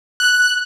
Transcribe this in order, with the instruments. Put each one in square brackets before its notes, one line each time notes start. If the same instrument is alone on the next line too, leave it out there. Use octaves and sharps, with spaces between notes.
[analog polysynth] F#6